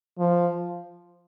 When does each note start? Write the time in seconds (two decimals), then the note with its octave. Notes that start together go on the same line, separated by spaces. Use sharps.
0.19 F3